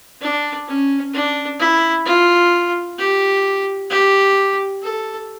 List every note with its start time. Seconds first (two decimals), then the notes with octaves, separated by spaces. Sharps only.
0.21 D4
0.68 C#4
1.14 D4
1.59 E4
2.06 F4
2.98 G4
3.90 G4
4.83 A4